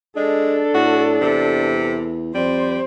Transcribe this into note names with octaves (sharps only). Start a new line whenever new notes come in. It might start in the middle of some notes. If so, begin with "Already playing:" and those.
G#3 D4 A4
A2 F#4
E2 C3
F2 G3 C5